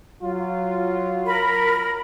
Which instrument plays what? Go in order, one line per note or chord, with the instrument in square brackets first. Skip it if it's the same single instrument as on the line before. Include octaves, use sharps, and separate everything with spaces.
[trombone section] F#3 F4
[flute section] A#4 B5